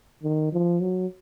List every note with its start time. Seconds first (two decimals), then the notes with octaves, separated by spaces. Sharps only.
0.23 D#3
0.53 F3
0.81 F#3